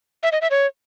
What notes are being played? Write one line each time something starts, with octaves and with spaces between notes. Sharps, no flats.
E5
D#5
E5
C#5